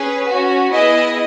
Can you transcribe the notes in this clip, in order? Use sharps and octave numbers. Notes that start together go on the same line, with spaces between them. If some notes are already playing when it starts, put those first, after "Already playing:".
Already playing: C#4 G#4 B4
C#4 F#4
B3 E4 G#4 D#5